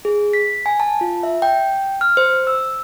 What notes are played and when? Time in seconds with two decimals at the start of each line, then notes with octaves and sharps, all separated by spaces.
0.05 G#4
0.33 B6
0.66 G#5
0.80 A5
1.01 F4
1.23 E5
1.42 G5
2.01 F6
2.17 C5
2.47 E6